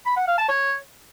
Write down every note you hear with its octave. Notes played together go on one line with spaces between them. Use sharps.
B5
F#5
F5
A5
C#5